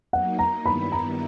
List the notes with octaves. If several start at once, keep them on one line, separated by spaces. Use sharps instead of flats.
F#3 A#3 D#4 F#5
A#5
G2 D#3 G3 B3 E4 B5
A#5